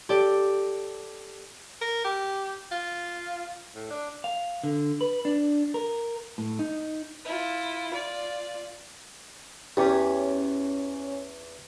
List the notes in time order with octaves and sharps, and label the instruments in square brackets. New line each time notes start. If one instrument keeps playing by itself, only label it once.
[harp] G4 A4 D5
[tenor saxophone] A#4
G4
F4
A2
D4
[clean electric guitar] F5
D3
B4
D4
A#4
A2
D#4
[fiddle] E4 F4
F4 D5
[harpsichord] E2 [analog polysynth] C#4 [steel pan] G4